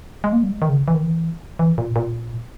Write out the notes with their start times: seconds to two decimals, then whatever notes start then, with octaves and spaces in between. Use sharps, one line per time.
0.24 G#3
0.33 A#3
0.43 G3
0.51 G#3
0.62 D#3
0.69 C#3
0.88 E3
0.94 D#3
1.03 E3
1.59 E3
1.78 A#2
1.96 A#2